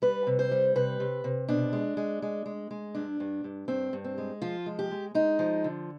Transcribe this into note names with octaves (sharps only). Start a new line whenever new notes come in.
G3 B4
C3
C5
G3
C3 B4
C3
C3
B2 D4
G#3
G#3
G#3
G#3
G#3
G2 D4
G2
G2
G2 C4
G2
C4
G#3
F3 F4
G#3
G4
G#3
G#3 D#4
F3
D3